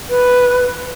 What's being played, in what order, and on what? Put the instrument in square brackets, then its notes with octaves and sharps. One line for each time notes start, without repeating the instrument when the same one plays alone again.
[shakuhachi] B4